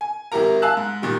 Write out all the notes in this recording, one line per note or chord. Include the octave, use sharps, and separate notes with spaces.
G#5
G#1 E4 G4 A#4 A#5
F5 G#5 A5 E6 F#6
G#2
A#2 D#3 G3